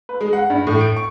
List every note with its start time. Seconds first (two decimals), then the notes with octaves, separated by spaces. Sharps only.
0.09 B4
0.21 G#3
0.33 F#5
0.50 G2
0.67 A2
0.81 D7
0.96 C#6